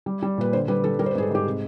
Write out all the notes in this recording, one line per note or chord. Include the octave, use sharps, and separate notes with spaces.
G3
G3
A#2 B4
D3 C5
G3 B4
G3 A4
G3 A#4
C5
B4
G#2 G#4
A4
G#2 G4
C3